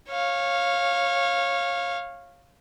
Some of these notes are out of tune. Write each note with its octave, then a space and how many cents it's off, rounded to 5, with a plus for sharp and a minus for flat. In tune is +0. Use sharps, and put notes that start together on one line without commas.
C#5 -15 F5 +0